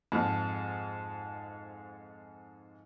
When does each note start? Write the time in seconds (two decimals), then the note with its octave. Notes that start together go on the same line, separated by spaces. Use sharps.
0.12 F2 G#2